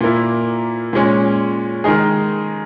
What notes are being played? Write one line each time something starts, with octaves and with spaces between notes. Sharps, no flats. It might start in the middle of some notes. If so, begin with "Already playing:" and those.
A#2 A#3 E4
A#2 G#3 C#4
D#3 G#3 D#4 G#4